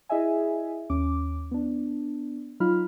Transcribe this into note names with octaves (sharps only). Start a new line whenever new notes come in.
E4 G#4 D#5 E5 G#5
D#2 C#4 D6
B3 D4
F#3 D#4 F4 B5 F6